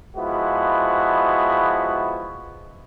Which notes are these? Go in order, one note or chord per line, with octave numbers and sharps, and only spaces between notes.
F3 G#3 B3 E4 F#4